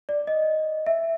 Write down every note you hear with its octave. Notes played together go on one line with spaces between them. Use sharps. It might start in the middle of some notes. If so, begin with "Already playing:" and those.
D5
D#5
E5